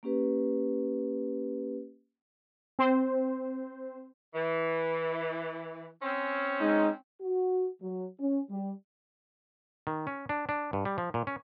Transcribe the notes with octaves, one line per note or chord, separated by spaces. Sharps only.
A#3 C#4 G4 B4
C4 C5
E3
C4 C#4
G#3 D#4
F#4
F#3
C#4
G3
D#3
C#4
D4
D4
G2
G3
F3
A#2
C#4